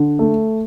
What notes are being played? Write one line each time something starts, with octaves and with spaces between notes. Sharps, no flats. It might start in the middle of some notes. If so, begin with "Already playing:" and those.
Already playing: D3
A3